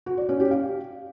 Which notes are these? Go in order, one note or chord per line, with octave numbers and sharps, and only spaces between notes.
F#4
D5
C#4
G4
F5